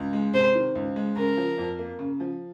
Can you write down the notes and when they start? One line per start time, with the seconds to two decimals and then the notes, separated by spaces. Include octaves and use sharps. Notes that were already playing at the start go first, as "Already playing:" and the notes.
Already playing: C#2
0.13 G#3
0.34 C3 C5
0.55 D#3
0.75 C#2
0.96 G#3
1.16 C#3 A#4
1.37 F3
1.58 F2
1.79 A#3
1.99 C#3
2.20 F3